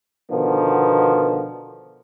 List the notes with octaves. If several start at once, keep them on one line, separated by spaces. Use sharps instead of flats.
B2 D3 D#3 F3 B3